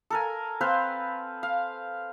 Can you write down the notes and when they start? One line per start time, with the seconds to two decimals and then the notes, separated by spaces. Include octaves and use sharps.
0.10 A4 A#4 G#5
0.61 C4 B4 C5 F5
1.43 F5